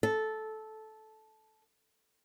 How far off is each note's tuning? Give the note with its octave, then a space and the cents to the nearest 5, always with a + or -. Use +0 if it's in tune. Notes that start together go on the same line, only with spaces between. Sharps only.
A4 -10